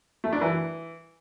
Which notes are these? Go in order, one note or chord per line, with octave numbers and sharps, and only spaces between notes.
A3
D4
E3